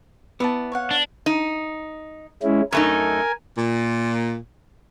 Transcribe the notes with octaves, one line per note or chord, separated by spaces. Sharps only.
B3 E4 D5 A5
C#5 F5 F#5
D4
D#4
G#3 C#4 E4
F#2 A3 D#4 A#4 G#5
A#2